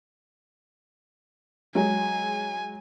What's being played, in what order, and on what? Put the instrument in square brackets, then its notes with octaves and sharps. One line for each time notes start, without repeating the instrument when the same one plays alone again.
[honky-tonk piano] F#3 G#3 [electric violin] G#5